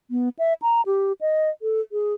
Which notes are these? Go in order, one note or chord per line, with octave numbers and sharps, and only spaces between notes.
B3
E5
A#5
G4
D#5
A4
G#4